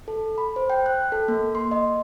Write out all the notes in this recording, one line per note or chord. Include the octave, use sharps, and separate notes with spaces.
A4
B5
C5
G5
F#6
A4
A#3
C6
D#5